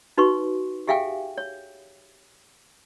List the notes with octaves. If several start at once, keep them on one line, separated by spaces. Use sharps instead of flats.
D#4 F#4 B4 C6 C#6
G4 G#4 E5 F5 G5 G#5
C#5